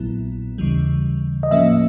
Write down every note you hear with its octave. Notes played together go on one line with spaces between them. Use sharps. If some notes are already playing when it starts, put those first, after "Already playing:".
Already playing: A#1 A#2 F#3 B3 E4
D#2 C#3 E3 G3
D#5
A2 F3 A#3 C#4 E5